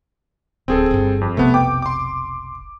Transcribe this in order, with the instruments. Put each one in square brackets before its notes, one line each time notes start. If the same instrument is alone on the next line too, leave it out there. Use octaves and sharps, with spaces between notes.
[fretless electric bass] D1 [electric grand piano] C4 G#4 A4
[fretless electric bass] G1 G2
[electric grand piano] F2
[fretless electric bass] F1 B1 C3 [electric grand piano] A3 B3
[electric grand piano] G5 D6
C6 D6